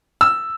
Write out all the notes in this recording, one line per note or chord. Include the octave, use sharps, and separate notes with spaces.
E6